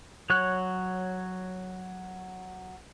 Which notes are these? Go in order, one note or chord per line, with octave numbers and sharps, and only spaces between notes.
F#3 C#5 C#6 F#6